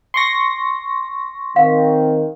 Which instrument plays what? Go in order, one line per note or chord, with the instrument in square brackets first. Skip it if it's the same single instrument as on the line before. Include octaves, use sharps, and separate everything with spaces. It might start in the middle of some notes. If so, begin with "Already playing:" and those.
[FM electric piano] C6 C#6 A#6
[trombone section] D#3 C4 [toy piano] F5